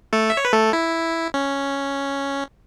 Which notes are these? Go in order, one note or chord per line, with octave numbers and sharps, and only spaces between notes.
A3 A4
E5
C#5
B4
A3 A4
E4
C#4